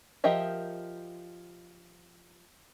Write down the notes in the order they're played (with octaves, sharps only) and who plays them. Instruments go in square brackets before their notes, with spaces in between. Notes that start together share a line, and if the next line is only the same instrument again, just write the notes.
[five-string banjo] F3 G4 A#4 D#5 E5